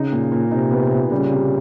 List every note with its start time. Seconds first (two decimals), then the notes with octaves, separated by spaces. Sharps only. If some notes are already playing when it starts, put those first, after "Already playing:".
Already playing: C#3 D#4
0.12 A#2
0.32 A#2
0.51 C3 D#4
0.71 B3
0.92 A#2
1.11 C#3 G3
1.31 C3